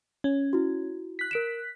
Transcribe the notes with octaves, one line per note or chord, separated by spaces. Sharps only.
C#4
E4 F#4
F#6 B6
A#4 D7 E7